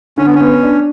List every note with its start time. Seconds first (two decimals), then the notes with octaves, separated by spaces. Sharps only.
0.18 D3 C#4
0.26 B3
0.34 C#4
0.40 B3
0.63 D4